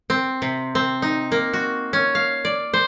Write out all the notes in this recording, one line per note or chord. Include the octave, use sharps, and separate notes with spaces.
C4
C3
C4
D#4
A#3
F#4
C#4
F5
D5
C5